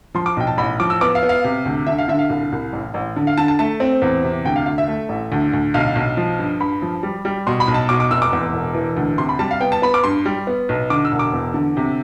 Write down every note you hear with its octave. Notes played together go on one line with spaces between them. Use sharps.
F3 C6
D6
B1 G5
A5
A1 B5
F3 D6
E6
B3 D6
F5
B3
F5
C3
D2
D3 E5
F5
D3 E5
F5
C2
C2
A1
A1
D3
F5
D3 A5
A5
A3 A5
C4
E2
C3
D2 G5
F5
D2 F5
E5
A3
A1
D2
D2
B1 F5
B1
F3
G2
G2 B5
F3
G3
G3
B2 C6
B5
B1
A5
B2 D6
D6
F1 E6
D6
E2
E1
E3
D2
C3 C6
B5
G3 A5
F5
B3 G5
A5
B3 B5
D6
G2 C6
G3
B3
B1
D3 D6
E6
E1
D6
E2
D3
C3